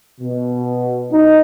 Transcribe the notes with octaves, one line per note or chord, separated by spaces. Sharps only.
B2
D#4